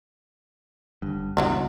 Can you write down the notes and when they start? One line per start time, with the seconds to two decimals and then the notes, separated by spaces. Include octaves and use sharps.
1.02 G1 G2
1.37 C#2 G2 B2 E3 F#3 D#4